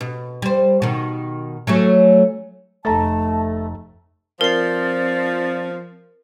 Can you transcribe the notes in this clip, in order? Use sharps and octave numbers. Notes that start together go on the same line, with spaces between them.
B2
G3 C5
B2 D#3
F#3 A3 C#4
F1 A3 A5 A#5 A6
F3 C4 A#4 D5 C7